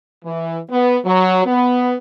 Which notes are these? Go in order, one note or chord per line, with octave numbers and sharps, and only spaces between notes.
E3
B3
F#3
B3